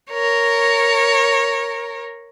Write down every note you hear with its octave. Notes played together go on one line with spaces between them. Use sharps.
A#4 C#5